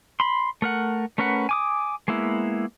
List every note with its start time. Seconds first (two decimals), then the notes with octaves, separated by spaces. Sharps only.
0.20 B5 C6
0.62 A3 A#4 F#5
1.18 A3 C#4 A#4 B4 F#5
1.49 G#5 D6 D#6
2.08 G#3 A#3 B3 E4